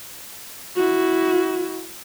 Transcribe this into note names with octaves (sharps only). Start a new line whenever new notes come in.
E4 F#4